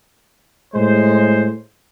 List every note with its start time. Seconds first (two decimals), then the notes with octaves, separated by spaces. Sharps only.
0.74 A2 G#3 C5